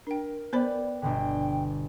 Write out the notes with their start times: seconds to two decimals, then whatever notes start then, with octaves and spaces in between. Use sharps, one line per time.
0.07 D4 A#4 G5
0.53 B3 B4 C5 D5 G5 B5
1.02 G1 B2 D3 G5